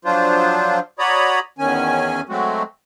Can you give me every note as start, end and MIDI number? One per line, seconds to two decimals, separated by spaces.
0.05 0.79 53
0.05 0.79 54
0.05 0.79 62
0.05 0.79 65
0.05 0.79 72
0.99 1.39 66
0.99 1.39 73
0.99 1.39 74
0.99 1.39 82
0.99 1.39 83
0.99 1.39 87
1.59 2.21 40
1.59 2.21 51
1.59 2.21 61
1.59 2.21 80
2.29 2.63 54
2.29 2.63 56
2.29 2.63 57
2.29 2.63 60
2.29 2.63 66